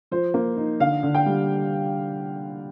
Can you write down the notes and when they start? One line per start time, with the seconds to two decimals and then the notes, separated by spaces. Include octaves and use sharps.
0.11 F3 C5
0.34 A#3
0.57 D#4
0.80 D3 F5
1.03 D3
1.15 G5
1.26 G3